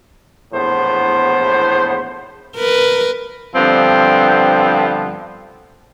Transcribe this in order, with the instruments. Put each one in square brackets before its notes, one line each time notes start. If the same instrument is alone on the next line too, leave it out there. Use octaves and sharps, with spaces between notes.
[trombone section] A#1 E2 A2 B3 C5
[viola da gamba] A#4 B4
[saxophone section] G2 D3 F3 B3 C4